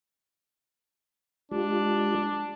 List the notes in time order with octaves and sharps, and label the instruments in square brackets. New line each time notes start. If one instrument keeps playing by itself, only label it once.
[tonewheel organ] G#3 F4 G4 [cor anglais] D4